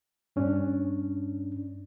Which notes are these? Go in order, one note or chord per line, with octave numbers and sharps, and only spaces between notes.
G2 C#4 D4